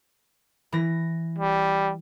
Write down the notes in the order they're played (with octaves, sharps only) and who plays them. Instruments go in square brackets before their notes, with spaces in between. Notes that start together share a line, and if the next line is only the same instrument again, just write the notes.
[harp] E3 A#6
[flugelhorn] G3